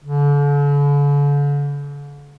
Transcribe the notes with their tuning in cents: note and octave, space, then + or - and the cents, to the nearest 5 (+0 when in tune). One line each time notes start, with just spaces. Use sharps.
D3 -40